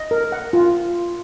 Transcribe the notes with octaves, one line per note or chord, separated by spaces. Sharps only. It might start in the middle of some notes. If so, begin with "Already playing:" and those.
Already playing: D#5
A#4
F#5
F4